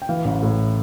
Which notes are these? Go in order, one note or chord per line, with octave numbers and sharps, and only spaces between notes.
G5
E3 F5
A1
A2